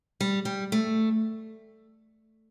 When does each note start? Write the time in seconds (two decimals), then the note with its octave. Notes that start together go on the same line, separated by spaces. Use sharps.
0.21 G3
0.45 G3
0.72 A3